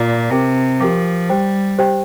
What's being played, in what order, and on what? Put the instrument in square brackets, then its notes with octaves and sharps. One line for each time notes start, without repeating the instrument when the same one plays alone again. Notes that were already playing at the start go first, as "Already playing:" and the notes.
Already playing: [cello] A#2 [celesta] F4 D5 A#5 D6
[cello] C3 [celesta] G4 A#4 G5 D6
[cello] F3 [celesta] G4 A#4 G5 D6
[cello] G3 [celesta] G4 C5 G5
[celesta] G4 C5 G5